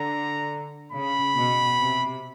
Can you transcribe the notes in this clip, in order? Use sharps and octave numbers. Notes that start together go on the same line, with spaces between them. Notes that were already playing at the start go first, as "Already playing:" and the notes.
Already playing: D3 A#5
C#3 B5
B2
C3